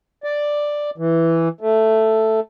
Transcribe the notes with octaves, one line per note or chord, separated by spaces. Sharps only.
D5
E3
A3